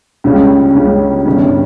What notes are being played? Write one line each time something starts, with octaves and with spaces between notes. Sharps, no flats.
C#2 C#3 G3 C#4
C#2 C#3 G3 C#4
G1 G2 D#3 G3 C#4